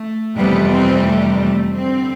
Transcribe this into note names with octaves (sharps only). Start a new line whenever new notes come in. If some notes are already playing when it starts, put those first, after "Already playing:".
Already playing: A3
F2 C3 E3 G3 B3
C4
A3
A3
G2 D3 G3 C4